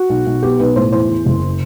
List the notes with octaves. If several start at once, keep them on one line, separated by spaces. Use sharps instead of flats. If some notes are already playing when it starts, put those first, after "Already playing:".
Already playing: F#4
B1
B1
B3 G4
B1 B4
A2 C5
E2 C5
E2
F#1